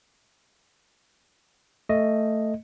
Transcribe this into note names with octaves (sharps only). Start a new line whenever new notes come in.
A3 D#5